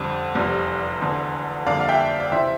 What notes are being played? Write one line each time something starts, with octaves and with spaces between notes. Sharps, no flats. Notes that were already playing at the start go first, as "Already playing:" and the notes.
Already playing: F2 D3 G3 C4
F1 E2 C3 G3
E1 E2 D3
F2 D3 G3 A#3 D5 F5
F5
E5 G5
D5
C3 E3 C5 E5